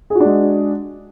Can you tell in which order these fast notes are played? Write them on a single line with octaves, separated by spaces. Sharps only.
G#4 F#4 D4 G#3